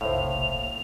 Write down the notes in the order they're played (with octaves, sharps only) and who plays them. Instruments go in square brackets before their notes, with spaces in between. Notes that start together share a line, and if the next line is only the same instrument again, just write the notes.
[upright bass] F1 B1 [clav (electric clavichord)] A2 [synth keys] C5 E5 F5 [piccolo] F7
[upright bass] A#3